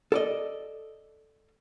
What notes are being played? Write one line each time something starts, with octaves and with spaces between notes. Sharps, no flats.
A4 D5 D#5